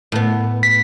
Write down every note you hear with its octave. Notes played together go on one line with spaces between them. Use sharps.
A2 B3
B6